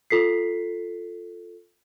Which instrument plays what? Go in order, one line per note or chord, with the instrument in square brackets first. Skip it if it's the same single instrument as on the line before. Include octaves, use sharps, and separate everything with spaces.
[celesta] F4 A4 B6 C7